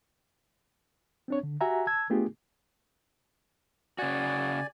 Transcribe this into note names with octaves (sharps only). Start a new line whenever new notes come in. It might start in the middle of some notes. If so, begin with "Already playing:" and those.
C4 D4 C#5
D3
F#4 G4 E5 F#5 G#5 A#5
A5 E6 G#6
A3 B3 D4 F4 G4 G#4
C#3 F#4 D5 G#5